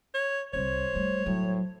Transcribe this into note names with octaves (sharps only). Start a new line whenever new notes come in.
C#5
C2 G3 C5 C#5
G3 A3
A2 F#3